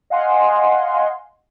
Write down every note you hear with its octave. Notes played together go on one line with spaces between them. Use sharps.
D#5 F5 F#5 G#5 C6